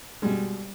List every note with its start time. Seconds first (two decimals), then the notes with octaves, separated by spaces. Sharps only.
0.22 B2 G3 G#3